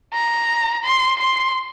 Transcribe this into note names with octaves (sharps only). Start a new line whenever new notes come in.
A#5
C6
C6